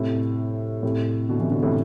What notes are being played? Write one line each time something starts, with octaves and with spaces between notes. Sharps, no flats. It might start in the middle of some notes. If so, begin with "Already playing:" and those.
Already playing: A2 C3
A2 C3
B2 D3
C3 E3
B2 D3
A2 C3